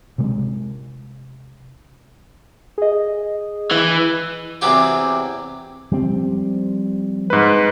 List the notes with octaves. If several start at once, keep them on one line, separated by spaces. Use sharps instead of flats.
C3 G#3
G#4 D#5
E3
E2 C3 E3 F#3 G4 C6
F3 G3 C4
G#2 B4